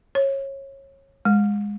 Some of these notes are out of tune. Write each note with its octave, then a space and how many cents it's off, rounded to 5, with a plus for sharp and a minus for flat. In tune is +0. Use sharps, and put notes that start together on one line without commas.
C#5 -25
G#3 -15